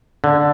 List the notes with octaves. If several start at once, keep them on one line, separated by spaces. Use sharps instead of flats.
D3